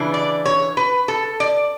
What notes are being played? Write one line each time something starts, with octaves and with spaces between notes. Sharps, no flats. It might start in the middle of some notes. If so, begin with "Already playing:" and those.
Already playing: C#3 E3 D4
D5
C#5
B4
A4
D5